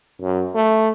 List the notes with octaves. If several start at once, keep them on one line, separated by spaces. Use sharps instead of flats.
F#2
A3